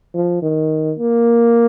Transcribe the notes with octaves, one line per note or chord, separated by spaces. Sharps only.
F3
D#3
A#3